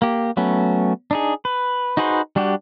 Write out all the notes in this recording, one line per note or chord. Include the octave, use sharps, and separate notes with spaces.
A#3 G4
F#3 A3 B3 C#4
D4 D#4 G#4
B4
D#4 F#4 G#4 B4 C5
G3 D4 F#4 G4